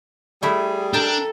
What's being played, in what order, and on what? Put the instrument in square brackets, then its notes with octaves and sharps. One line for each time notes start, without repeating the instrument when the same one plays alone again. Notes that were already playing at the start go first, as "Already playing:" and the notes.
[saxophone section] G3 G#4 [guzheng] A3 E4
[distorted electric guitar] D4 [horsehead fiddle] A4 [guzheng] A#4 G5 A5